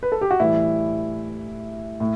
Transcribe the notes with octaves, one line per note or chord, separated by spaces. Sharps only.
B4
A4
G4
F#4
A2 E3 G3 E4
A2